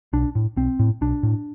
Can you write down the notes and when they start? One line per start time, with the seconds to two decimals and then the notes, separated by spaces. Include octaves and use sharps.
0.13 B1 D4
0.35 A2
0.57 B1 C4
0.79 A2
1.01 B1 D4
1.23 A2